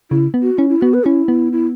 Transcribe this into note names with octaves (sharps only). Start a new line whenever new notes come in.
C#3 E4
B3
F#4
C#4 E4
E4
B3 F#4
B4
C#4 E4
B3
E4